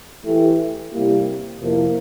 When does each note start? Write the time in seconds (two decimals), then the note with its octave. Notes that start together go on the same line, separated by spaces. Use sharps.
0.24 E3 A3 E4 G4
0.92 C3 G3 A#3 E4 G4
1.59 F2 C3 F3 A#3 E4